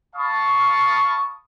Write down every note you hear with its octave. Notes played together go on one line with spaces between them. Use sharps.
F5 A5 B5 C#6 D#6